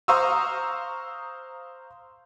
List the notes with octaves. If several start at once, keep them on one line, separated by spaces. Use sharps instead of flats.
C5 F5 A#5 C#6 D#6 E6